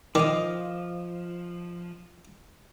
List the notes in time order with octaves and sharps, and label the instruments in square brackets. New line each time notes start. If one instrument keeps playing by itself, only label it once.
[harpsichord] D#3 [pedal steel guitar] F3 [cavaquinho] D#5 F5 D6